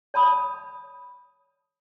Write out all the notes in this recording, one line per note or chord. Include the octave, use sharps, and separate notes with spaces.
C#5 A5 B5 D#6